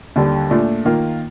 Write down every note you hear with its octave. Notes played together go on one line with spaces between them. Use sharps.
D#2 D3 G3
A#2 A3 D4
D#3 A#3 F4